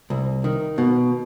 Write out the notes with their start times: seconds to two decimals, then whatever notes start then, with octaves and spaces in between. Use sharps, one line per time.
0.10 C2
0.44 D#3
0.78 B2